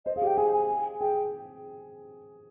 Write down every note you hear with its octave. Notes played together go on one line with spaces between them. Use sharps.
C5 D#5
G#4 F5
G4
G5
G#4 G#5
G#5
G#4 G5